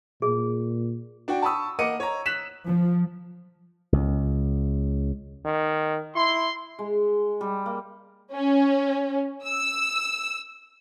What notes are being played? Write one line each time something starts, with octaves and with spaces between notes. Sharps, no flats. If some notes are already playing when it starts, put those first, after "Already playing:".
A#2 G#4
D4 F#4 G5
A5 B5 C#6 D#6 E6
A#3 D#5 F#5 D6 C#7 D#7
C#5 A#5
F#6 B6 E7 F#7
F3
C#2
D#3
E4 C6
G#3
G3
A#3
C#4
E6